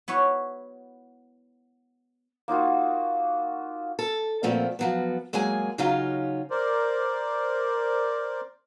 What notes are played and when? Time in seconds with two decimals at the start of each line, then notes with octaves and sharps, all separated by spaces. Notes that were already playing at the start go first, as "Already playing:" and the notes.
0.08 B3 E4 F#4 C#5 F#5
2.48 A#3 D#4 F4 F#4
3.99 A4
4.43 A#2 F3 A3 B3 C4
4.79 F3 F#3 B3
5.33 F#3 G#3 A#3 G#4 G#5
5.78 C#3 F#3 C#4 D#4 F4
6.50 A#4 C5 D5